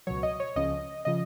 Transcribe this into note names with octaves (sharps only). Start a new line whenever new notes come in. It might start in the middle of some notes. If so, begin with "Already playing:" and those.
C#2 B2 F#3 C#5
D#5
C#5
C#2 C#3 F3 D#5
C#3 F3 D#5